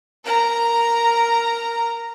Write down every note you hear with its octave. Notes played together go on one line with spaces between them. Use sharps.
A#4 A#5